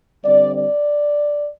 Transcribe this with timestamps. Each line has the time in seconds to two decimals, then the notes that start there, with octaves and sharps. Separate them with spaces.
0.24 D3 G3 C4 D5
0.54 D5